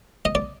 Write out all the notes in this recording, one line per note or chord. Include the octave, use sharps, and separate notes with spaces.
D#5
D5